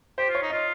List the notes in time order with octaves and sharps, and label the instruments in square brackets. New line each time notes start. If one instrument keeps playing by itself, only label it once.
[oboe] G4 [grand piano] C5
[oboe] F4
[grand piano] C#5
[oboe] D#4
[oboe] F4 [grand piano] D#5